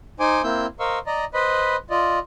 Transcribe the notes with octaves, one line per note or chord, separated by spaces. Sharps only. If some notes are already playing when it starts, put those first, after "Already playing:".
D#4 C5 G#5 D6
A#3 C4 E4 E6 G6
A#4 C5 D#5 F5 C#6 E6
D5 D#5 A#5
B4 C5 D#5 B5
F4 D5 D#5